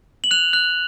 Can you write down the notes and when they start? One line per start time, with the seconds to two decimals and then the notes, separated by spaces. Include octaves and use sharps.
0.24 F#7
0.31 F#6 F7
0.53 F#6